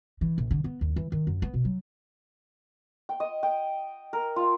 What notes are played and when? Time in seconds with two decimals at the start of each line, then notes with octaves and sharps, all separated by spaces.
0.21 E3
0.38 A#1
0.51 D3
0.64 B3
0.81 D#2
0.96 E3
1.12 D#3
1.27 F#2
1.42 B3
1.54 B2
1.65 F#3
3.09 G5
3.20 D#5
3.43 G5
4.13 A#4
4.36 F4